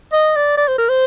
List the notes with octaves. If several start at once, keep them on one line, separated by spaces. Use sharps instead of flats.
D#5
D5
D5
C5
A#4
C5